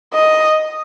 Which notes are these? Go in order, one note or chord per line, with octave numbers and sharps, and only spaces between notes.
D#5